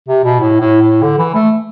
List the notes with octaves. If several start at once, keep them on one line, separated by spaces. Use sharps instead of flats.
C3
B2
A2
A2
A2
D3
E3
A3